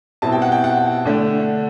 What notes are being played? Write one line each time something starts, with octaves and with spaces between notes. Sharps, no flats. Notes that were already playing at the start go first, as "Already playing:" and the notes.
B2 G3 C4 E4 A5
G5
F#5
G5
F#5
D3 A3 D4